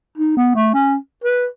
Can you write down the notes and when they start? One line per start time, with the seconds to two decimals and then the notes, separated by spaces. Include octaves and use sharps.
0.18 D#4
0.37 B3
0.55 A3
0.74 C#4
1.24 B4